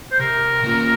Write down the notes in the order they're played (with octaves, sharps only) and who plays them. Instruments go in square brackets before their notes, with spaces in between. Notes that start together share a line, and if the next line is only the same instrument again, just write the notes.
[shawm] C5
[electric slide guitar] C3 [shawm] A#4
[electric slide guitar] D#3 A#3 C#4 F4